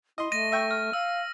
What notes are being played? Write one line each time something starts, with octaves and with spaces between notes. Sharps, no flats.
E4 D#5 C6
A3 A#6 D#7
E5 G5 C#6
F6
F5 E6